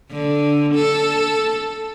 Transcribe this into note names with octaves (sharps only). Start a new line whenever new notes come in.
D3
A4